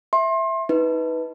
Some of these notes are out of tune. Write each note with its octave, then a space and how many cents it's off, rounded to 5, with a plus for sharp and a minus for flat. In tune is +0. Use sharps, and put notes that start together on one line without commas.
E5 +0 C6 +30
D#4 +35 B4 +0